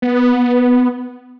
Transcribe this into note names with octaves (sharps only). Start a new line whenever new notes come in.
B3